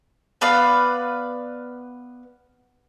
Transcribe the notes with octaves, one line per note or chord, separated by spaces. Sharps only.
B3 B4 D5 F5